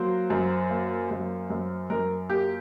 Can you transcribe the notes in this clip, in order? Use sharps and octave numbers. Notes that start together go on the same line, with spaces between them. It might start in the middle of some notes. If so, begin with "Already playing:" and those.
Already playing: F#3 A#3 C5
F#2
A#3
F#2
F#2
F#2 A#4
A#3 G4